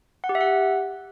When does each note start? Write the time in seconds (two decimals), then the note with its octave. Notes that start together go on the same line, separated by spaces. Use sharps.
0.24 F#5
0.29 G4
0.35 E5
0.41 F#5